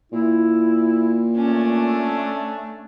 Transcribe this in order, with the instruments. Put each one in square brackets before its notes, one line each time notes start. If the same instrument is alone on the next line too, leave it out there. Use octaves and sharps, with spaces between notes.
[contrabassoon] A#2 [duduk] E4
[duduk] A3 [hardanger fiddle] C#4 D4